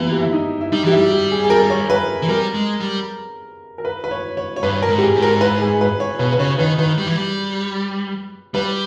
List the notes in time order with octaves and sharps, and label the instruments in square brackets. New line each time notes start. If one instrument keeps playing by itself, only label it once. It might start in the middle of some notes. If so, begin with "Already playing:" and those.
Already playing: [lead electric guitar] E3 [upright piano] G3 A#3 B3
[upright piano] G4
E4
D#4
E4
[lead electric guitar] G3 [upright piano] D#4
[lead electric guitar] E3 [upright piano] G4
[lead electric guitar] G3 [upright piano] E4
[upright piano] G4
G#4
G#4
A#4
C#5
B4
[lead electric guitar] E3
[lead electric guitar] G3 [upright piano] A#4
[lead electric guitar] G#3
G3
[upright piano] A#4
B4
B4
C#5
C#5
C#5
[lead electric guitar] G2 [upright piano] B4
[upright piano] A#4
[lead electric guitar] G#2
[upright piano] G4
G#4
[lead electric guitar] G#2
[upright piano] A#4
B4
G#4
B4
C#5
[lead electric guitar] B2 [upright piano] B4
[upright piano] B4
[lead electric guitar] C#3 [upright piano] C#5
[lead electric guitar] D#3 [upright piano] B4
[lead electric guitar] D#3 [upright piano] B4
[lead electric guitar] G3
E3
G3
[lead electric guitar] G3 [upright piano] B4